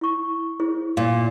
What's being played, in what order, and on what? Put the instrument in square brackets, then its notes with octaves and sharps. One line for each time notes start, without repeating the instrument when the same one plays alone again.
[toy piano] E4 C#6
E4 G#4 C5
[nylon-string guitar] A#2 [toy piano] F5